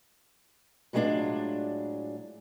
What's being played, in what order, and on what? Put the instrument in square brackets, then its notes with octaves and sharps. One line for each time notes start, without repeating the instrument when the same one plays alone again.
[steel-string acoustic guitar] A2 F#3 G#3 B3 D4 F4